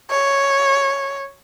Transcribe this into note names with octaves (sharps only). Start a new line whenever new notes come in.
C#5